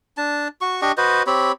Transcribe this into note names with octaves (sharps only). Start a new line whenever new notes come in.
D4 A5
F#4 C#6
D4 G4 D#5 C#6
F#4 B4 C5 D#5
C4 G4 C#5 B5